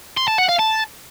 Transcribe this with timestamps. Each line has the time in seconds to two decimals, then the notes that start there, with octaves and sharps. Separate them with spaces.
0.17 C6
0.28 A5
0.38 F#5
0.48 F5
0.59 A5